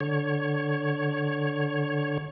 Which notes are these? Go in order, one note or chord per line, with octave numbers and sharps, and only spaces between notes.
D3 C#5